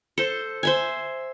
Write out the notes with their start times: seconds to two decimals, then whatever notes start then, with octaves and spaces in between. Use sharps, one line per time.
0.18 A4 C5
0.63 C5 E5 G#5